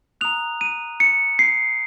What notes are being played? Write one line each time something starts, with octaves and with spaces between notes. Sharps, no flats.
A#5 D#6 F#6 F7
D#7
C#7
C7